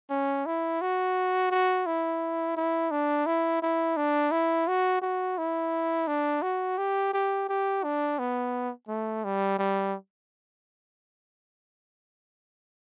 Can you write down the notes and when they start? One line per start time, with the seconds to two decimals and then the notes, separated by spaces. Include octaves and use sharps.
0.10 C#4
0.46 E4
0.82 F#4
1.51 F#4
1.87 E4
2.57 E4
2.91 D4
3.27 E4
3.62 E4
3.97 D4
4.32 E4
4.68 F#4
5.02 F#4
5.38 E4
6.08 D4
6.43 F#4
6.78 G4
7.14 G4
7.49 G4
7.84 D4
8.19 B3
8.89 A3
9.25 G3
9.59 G3